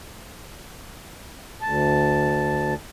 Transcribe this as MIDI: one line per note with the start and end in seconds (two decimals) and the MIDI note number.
1.62 2.74 38
1.62 2.74 81